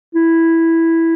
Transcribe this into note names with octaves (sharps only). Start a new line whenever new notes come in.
E4